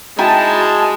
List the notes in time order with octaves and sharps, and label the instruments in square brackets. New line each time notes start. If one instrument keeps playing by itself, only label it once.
[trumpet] G#3 [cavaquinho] D#4 E4 G5 [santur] F#4 A#5 [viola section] A5